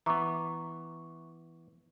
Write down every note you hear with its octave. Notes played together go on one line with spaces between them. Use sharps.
E3 B3 E5 A#5 C#6 D6